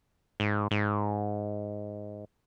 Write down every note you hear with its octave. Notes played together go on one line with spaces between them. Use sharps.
G#2
G#2